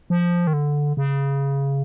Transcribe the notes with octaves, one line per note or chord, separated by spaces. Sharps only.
F3
D#3
D3
C#3